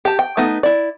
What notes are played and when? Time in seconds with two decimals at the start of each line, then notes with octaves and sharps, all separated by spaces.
0.05 G4 A5
0.19 G5
0.37 A3 B3 D#4
0.63 E4 D5